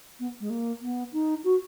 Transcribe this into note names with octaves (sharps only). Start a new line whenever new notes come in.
B3
G#3
A#3
B3
D#4
F#4